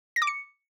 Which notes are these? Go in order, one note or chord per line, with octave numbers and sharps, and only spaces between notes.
A#6
D6
C#7